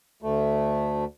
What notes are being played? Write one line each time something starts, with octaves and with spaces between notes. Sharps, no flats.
D2 A3